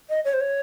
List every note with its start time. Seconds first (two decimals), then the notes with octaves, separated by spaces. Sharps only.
0.10 D#5
0.25 C#5
0.34 C5
0.40 C#5